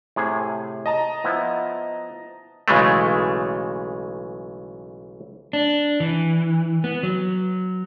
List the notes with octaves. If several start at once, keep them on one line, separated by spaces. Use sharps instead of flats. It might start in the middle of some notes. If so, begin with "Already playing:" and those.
A2 C3 G#4
D#5 A5 A#5
F3 B3 E4
B1 C#3 E3 G#3 A3
D4
E3
B3
F#3